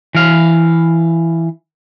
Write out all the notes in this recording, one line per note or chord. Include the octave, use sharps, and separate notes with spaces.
E3 F5